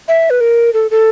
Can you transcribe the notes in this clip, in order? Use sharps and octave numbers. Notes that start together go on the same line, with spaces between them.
E5
B4
A#4
A4
A4